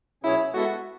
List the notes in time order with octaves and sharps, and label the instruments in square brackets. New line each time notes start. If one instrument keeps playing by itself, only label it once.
[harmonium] B2 F#3 C#4 G#4 C#5 [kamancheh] E4
[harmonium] G#3 B3 E4 A4 E5 [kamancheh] F#4